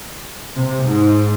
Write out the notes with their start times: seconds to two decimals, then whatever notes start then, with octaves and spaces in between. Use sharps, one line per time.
0.55 C3
0.84 G#2